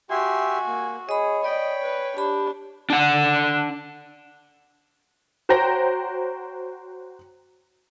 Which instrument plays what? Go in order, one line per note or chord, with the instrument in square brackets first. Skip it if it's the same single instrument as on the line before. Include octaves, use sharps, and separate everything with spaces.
[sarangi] F#4 [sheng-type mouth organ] G4 E5 C6 [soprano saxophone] G#5
[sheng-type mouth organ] A#3
[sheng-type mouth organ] G#4 [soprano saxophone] C#5 [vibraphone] D#5 B5
[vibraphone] D5 [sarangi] D#5 [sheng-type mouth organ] G5 B5
[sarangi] B4
[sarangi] D4 [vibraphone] G4 B5
[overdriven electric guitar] D4 F#5
[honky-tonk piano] F#4 C5 C#5 G5 A#5 A#6